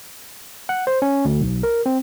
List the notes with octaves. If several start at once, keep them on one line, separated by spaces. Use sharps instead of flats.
F#5
C5
C#4
D2
B1
A#4
C4